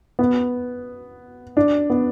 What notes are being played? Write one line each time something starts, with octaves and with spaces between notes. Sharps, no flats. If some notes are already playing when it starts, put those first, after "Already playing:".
B3
D4
B3